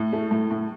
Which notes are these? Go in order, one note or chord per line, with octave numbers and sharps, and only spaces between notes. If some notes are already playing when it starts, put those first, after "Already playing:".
Already playing: A2
A3
A2
A2